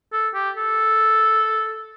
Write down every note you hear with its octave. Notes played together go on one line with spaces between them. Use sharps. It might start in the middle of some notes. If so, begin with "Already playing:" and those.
A4
G4
A4